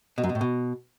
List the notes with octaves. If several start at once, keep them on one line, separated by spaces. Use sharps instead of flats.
B2
F#2
B2
A2
B2